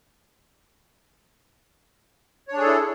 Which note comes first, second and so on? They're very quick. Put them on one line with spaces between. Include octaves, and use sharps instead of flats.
C#5 D4 G#4 A4 E4